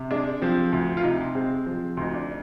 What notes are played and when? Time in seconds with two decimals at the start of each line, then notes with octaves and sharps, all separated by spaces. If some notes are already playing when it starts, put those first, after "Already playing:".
Already playing: C3
0.11 G#3 D4
0.42 F3 C4
0.72 D2
0.97 F4
1.03 C3 D#4
1.35 G#3 C4
1.66 F3 C4
1.97 D2 D#4
2.14 D4